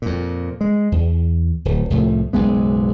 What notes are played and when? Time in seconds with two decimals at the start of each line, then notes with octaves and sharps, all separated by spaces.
0.02 F2 A#2
0.61 G#3
0.92 E2
1.65 D1
1.90 C2 A2 F3 A3
2.33 F#1 B1 G#3 B3